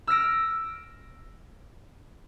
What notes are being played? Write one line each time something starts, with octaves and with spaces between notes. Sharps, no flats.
E6 F6 A#6 D7